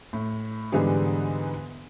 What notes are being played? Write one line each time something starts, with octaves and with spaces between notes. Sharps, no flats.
A2
G#2 D3 E3 G3 B3 G#4